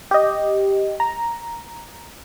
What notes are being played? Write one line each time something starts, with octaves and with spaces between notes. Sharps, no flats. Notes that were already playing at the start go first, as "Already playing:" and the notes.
G4 D#5
A#5